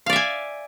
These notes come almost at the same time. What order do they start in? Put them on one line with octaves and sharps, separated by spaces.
F5 D5 E5 G#5